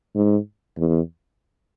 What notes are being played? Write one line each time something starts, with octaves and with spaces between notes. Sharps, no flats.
G#2
E2